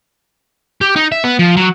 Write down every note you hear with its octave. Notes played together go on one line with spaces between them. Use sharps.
G4
D#4
E5
B3
F3
F#3